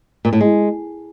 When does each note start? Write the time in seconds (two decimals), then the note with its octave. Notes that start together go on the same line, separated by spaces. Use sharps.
0.25 A#2
0.33 A2
0.41 G#3